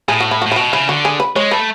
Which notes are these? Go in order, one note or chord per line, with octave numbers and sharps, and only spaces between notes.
A2 G#4
F#4
E4
A2 F#4
E4
B2 F#4
C#3 E4
D3 F#4
G#4
B4
G#3 C#5
A3 B4